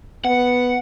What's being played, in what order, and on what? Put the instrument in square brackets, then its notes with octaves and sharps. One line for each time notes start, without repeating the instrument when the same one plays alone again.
[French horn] B3 [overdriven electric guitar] F#5